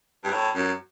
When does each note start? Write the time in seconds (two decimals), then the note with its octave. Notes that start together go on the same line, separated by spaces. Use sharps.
0.24 G2
0.33 A2
0.55 F#2